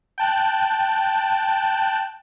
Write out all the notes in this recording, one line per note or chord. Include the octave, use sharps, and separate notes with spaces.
G5 A5 F#6